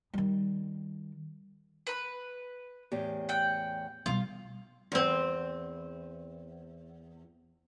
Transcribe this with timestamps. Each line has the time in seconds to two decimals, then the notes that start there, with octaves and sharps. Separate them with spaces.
0.14 D#3 G3
1.87 B4 B5
2.92 E2 A2 G4
3.29 F#5 G5
4.06 B2 G3 F4
4.92 E2 C4